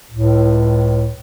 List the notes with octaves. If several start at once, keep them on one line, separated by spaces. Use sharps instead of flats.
C#2 A2